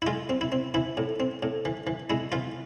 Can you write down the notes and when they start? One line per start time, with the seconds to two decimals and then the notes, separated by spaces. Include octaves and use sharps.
0.02 E4
0.07 G#3 F4
0.29 C4
0.41 E4
0.52 C4
0.74 E3 E4
0.97 A2
1.20 C4
1.43 A2
1.65 E3
1.87 E3
2.10 G#3 E4
2.32 E3 F4